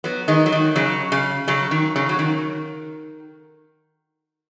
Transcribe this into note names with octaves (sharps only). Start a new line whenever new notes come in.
F#3 B3
D#3 G#3
F#3
D#3
C#3 F#3
C#3
C#3 F#3
D#3
C#3 F#3
F#3
D#3